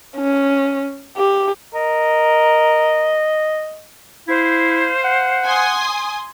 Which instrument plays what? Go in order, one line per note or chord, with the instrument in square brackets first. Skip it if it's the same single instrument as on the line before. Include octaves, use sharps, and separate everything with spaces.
[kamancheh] C#4
G4
[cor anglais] A#4 [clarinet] D#5
[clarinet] E4 [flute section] C5 F5 G6
[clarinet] F#5
[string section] G#5 C6 D#6